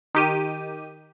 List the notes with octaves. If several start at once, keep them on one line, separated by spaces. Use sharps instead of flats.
D#3 G4 D#7